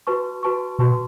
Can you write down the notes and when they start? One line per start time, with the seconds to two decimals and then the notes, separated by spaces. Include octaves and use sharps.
0.07 F#4 B4 A5 C#6
0.43 F#4 B4 A5 C#6
0.79 B2 F#4 B4 A5 C#6